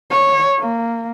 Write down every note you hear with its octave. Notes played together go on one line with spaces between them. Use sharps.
C#5
A#3